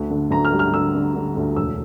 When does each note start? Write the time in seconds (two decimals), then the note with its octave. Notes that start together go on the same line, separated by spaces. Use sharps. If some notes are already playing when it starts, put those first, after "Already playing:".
Already playing: D2
0.10 D3
0.31 D2 A#5
0.45 F6
0.52 G3
0.59 F6
0.73 D3 E6
0.95 D3
1.15 D3
1.36 D2
1.56 E1 E6